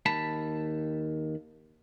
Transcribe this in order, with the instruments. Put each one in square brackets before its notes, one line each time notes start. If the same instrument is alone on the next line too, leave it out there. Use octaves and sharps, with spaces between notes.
[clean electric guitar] D#2 A5 B5